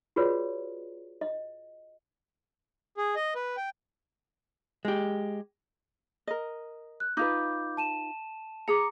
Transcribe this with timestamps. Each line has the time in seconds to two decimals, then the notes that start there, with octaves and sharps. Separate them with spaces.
0.16 F4 F#4 G#4 B4 C#5 D5
1.21 D#5
2.97 G#4
3.16 D#5
3.35 B4
3.57 G5
4.85 G#3 G4
6.27 A#4 D#5
7.00 F#6
7.17 D#4 F4 B4 D6 G6
7.77 A5 D#7 E7
8.68 G#4 A#5 D6 C#7